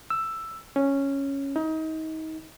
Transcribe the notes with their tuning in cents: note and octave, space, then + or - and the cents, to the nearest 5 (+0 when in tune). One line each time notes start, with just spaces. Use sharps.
E6 +10
C#4 -5
D#4 +30